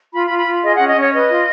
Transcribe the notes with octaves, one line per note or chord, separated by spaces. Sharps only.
F4 B5
B5
F4
B5
F4
G#4 D#5
C#4 F#5
D#5
C#4 C#5
B4 D#5
F4